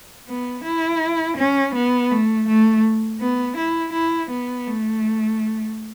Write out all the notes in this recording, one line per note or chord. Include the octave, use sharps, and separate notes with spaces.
B3
E4
C#4
B3
A3
A3
B3
E4
E4
B3
A3